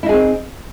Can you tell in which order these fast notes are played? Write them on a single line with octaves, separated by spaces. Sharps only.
E4 D#4 G#4 C4